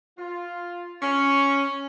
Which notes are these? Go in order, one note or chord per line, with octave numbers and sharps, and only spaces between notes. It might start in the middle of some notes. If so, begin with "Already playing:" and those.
F4
C#4